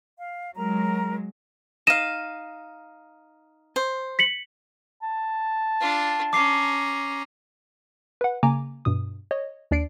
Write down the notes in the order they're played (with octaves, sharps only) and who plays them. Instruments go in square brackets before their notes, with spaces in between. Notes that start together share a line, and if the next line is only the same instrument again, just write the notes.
[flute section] F5
[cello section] F#3 G#3 [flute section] A#4 A#5
[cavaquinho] D#4 F5 [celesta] A#6 D#7 E7
[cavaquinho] C5
[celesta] B6 C#7 F#7
[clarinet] A5
[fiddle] D4 F4
[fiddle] C#4 A#5 [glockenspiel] D6 C7
[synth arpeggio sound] B4 F#5
C#3 A#3 G#5 A#5 D6
G2 B2 D#6
C#5 D#5
D#2 D4 D5 C7 D7